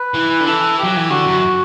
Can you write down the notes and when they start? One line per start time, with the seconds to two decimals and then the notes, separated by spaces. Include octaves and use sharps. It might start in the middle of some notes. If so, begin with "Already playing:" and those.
Already playing: B4
0.14 E3
0.40 D3
0.47 E3 A4
0.79 F#3 G4
0.97 E3
1.10 D3 F#4
1.26 F#2